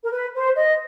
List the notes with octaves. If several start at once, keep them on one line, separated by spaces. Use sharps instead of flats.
A#4
B4
C5
D#5